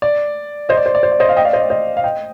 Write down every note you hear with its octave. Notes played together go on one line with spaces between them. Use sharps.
D5
C5 D#5
D5
C5
D5
C5
D5
C5 D#5
D5 F5
D#5 G5
D5 F5
C5 D#5
D5
C5 D#5
F5
D#5 G5